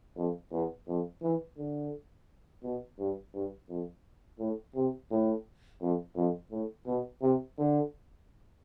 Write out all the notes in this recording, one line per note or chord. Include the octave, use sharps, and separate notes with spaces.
F2
E2
F2
E3
D3
B2
G2
G2
F2
A2
C3
A2
F2
F2
A2
B2
C3
D3